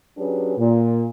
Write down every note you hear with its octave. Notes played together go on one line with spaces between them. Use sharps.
F#3 C#4 D4 G4 G#4 B4
A#2